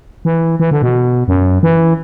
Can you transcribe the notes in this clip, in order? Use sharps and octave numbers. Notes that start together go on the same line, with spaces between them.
E3
E3
D3
B2
F#2
E3